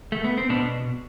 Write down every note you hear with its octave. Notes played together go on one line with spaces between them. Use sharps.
A3
B3
C4
B2 B3 D4